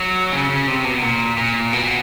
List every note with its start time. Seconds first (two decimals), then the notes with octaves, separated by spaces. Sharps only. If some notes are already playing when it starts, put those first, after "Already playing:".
Already playing: F#3
0.32 C#3
0.50 C#3
0.68 C3
0.84 B2
1.02 A#2
1.37 A#2
1.73 B2